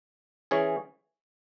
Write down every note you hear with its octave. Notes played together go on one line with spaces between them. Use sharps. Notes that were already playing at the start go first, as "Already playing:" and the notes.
E3 C#4 G#4 C#5